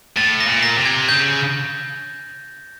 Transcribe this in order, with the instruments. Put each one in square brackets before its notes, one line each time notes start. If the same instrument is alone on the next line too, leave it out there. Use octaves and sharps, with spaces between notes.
[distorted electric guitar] A2 [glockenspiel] A6
[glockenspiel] A#6
[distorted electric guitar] A#2
[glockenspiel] A#6
[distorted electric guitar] C3
[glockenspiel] G#6
[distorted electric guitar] C#3 [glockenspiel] G6